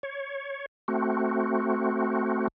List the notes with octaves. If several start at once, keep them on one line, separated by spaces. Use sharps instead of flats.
C#5
A3 C4 F#4